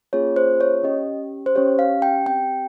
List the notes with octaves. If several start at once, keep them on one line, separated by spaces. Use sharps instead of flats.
A#3 C#4 F4 G#4 C#5
C5
C#5
C#4 G4 D#5
C5
C#4 G4 C#5
F5
G5
C4 G4 G5